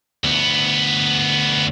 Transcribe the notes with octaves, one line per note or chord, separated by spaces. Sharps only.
D2 B3